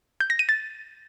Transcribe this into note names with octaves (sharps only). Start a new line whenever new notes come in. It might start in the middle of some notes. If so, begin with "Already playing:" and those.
G6
A#6
D#7
A6